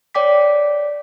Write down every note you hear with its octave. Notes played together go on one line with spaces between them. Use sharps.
C#5 D5 G5 D6 B6